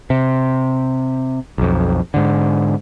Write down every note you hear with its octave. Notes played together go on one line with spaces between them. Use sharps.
C3
B1 F2
G#2 D3